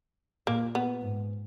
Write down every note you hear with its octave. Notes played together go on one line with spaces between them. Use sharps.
A#2 A#3
B3
G#2